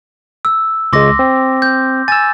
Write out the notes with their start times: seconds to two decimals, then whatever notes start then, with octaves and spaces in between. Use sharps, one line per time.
0.45 E6
0.93 C#2 G#3 C6 D6 A#6
1.19 C4
1.62 G6
2.08 G#5 E6 A6